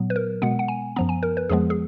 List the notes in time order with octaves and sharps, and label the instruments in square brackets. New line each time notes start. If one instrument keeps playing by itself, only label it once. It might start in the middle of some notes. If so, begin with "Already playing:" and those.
Already playing: [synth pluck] A#2 F#3 B3
B4
A#4
B2 G#3 B3 F#5
F#5
G#5
F#2 F3 B3 A#5
G#5
A#4
B4
F2 F3 G#3 B3 G#4
G#4